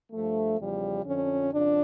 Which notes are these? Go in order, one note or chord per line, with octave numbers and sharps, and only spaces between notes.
G2 F3 A3
E2 C#3 F3 G3
F2 D3 F3 C#4
F2 C#3 F3 D4